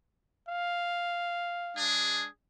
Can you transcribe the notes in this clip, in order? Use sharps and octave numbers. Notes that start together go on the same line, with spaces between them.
F5
G#3 D4 G#4